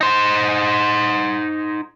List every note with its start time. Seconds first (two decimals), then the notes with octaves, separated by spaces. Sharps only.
0.01 D#4 C5